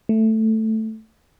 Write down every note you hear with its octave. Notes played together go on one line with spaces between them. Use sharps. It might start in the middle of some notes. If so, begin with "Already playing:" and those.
A3